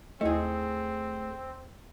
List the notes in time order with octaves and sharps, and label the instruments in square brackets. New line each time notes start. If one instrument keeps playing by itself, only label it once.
[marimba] D#2 E4 D#5 [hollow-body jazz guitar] A3 G#4 [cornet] C4